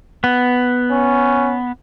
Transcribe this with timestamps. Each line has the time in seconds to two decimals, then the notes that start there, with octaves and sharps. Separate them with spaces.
0.24 B3
0.91 C#4